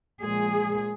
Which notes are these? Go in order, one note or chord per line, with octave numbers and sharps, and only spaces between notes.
A#2 F3 G#3 G#4